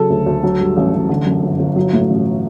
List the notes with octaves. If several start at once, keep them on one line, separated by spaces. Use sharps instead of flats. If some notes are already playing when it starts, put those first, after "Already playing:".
Already playing: C#3 F#3 A4
D2
D2
F#3
G2
A1
A1
D3
F#2
G1
G1
F#3
A2
A1